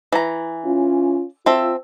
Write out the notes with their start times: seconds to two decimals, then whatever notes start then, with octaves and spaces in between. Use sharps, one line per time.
0.12 E3 A#5
0.65 C#4 F4
1.46 C4 F4 A4 E5